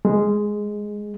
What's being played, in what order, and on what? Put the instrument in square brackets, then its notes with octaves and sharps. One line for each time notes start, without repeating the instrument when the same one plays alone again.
[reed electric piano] G#3